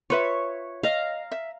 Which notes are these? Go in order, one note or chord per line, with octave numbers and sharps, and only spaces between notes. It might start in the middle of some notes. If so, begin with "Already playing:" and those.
F4 B4 C#5 E5
D#5 F5 A#5
E5